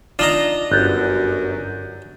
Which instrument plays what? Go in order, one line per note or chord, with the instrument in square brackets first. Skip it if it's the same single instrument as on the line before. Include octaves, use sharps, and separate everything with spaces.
[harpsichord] D4 D#4 A#5 [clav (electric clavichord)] F4
[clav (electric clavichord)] G1 [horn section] F#2 [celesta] F#6 G6 A6